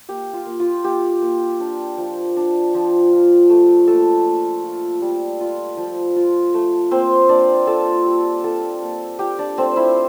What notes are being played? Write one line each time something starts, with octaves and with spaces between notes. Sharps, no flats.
A#3 G4
F4
A#3
F4
A#3 G4
A#3
D4
F3
D4
F3
F4
A3
A3 A#3 A4
A#3
F4
G3
F4
F3
F4
A3
A#3 C4 C5
A#3 D4 D5
F4 A4 A5
G3
F4 A4 A5
A#3
F4 G4 G5
D4 D5
A3 C4 C5
E4 E5